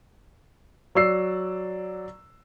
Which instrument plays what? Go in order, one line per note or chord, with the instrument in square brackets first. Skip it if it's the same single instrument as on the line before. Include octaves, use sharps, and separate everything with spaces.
[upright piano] F#3 D5 E6 C7